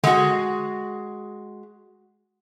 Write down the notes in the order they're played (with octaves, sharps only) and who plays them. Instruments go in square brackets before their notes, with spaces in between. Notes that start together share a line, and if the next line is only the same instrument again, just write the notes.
[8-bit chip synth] D3 [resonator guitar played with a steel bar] G#3 F#4